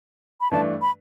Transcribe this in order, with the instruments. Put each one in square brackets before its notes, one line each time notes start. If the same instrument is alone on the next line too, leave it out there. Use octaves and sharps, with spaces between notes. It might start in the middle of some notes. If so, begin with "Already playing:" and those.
[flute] B5
[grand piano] G2 E3 A3 D4 [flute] A5
[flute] B5